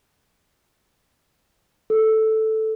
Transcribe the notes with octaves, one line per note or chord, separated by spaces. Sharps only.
A4